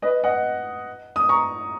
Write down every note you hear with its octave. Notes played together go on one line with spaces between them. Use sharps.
B4 D#5
D#5 F#5
D#6
A#5 C#6